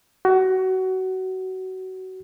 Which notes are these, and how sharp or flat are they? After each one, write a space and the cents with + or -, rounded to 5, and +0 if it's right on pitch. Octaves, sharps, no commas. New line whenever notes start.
F#4 +20